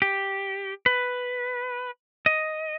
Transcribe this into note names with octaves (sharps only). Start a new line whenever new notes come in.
G4
B4
D#5